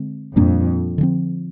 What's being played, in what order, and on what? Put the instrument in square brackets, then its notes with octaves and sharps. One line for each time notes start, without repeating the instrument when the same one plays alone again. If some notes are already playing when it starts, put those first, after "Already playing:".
Already playing: [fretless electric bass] D3 G#3 C4
[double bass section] F2 [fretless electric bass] A#2 G3 A#3 D4
[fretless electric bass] D3 F3 C4